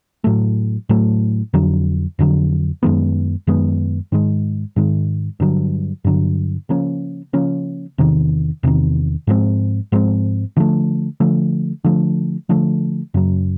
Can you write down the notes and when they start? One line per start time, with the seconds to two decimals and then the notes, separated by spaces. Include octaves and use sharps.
0.24 A2 F#3 A3
0.89 A2 F#3 A3
1.54 F2 D3 F#3
2.19 F2 D3 F#3
2.83 F#2 D#3 G#3 B3
3.47 F#2 D#3 G#3 B3
4.12 G#2 D#3 G#3
4.76 G#2 D#3 G#3
5.40 G2 D3 F#3
6.04 G2 D3 F#3
6.69 C#3 F3 A#3 C#4
7.33 C#3 F3 A#3 C#4
7.98 E2 C3 D#3
8.63 E2 C3 D#3
9.27 G#2 F3 G#3 C4
9.92 G#2 F3 G#3 C4
10.57 D3 F3 A3
11.20 D3 F3 A3
11.84 D3 F3 A3
12.49 D3 F3 A3
13.14 F#2 C#3 F#3